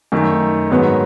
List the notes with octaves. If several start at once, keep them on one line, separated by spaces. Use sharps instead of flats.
F#2 D#3 A3
G#2 D#3 F#3 B3